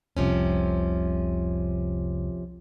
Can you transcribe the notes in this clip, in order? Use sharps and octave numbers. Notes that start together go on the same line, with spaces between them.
F1 C2 C3 F3 G3 C#4